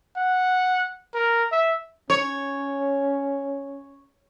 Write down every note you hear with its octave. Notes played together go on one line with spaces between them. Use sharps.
F#5
A#4
E5
C#4 C#5